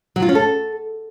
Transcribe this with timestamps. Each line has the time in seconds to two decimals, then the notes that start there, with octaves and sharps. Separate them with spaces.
0.16 F#3
0.22 F4
0.29 C#4
0.35 A4